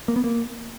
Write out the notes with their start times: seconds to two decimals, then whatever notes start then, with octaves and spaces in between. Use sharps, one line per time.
0.08 A#3
0.16 B3
0.24 A#3